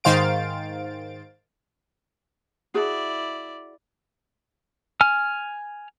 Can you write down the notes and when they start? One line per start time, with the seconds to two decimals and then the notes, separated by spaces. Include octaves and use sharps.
0.04 G#2 D#3 C5 F5 A6 D7
2.74 E4 F#4 G#4 D5 A5
5.01 G#5 F6